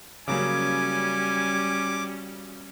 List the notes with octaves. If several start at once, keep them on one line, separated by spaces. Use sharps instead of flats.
C#3 F#3 G3 A#3 C#4 G#5 D6